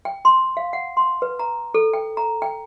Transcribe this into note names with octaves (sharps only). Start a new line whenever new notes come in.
G5
C6
F5
F#5
C6
B4
A#5
A4
G5
A#5
G5